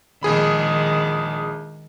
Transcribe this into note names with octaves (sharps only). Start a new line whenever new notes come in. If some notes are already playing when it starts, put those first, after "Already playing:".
A#1 D#3 G#3 G#4 B5